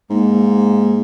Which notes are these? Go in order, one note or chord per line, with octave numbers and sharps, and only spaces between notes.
G#2 A#3